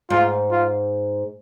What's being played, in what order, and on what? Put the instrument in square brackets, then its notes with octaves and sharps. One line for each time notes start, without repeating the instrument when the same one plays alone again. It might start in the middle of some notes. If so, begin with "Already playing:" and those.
[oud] G#2 [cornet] F4
[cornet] F4